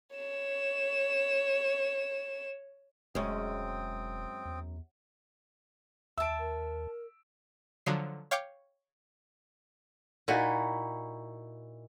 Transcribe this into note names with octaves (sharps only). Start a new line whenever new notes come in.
C#5 E7
E1 F#2 G#3 C4 C#4 G5 D#6
E2
D#2 E5 A5 E6 D7
A#4
D3 F3 F#3 C7
C#5 F5 G5 C#6 D6
A#2 D#4 E4 F#4 G#5